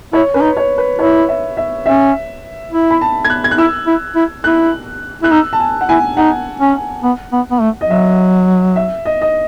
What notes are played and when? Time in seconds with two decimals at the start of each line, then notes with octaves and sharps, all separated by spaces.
0.13 E4 C#5
0.34 C#4 B4
0.42 D#4
0.57 C#5
0.78 B4
0.99 E4 C#5
1.29 E5
1.57 E5
1.86 C#4 E5
2.72 E4
2.91 B5
3.01 A5
3.25 G#6
3.30 F#6
3.44 G#6
3.51 F#6
3.58 E4 E6
3.87 E4
4.16 E4
4.44 E4 F#6
5.23 E4 F#6
5.31 D#4 E6
5.53 A5
5.60 G#5
5.81 F#5
5.89 E4 G#5
6.17 D#4 F#5
6.60 C#4
7.04 B3
7.32 B3
7.51 B3
7.61 A3
7.81 D#5
7.89 F#3 E5
8.76 E5
9.05 D#5
9.21 D#5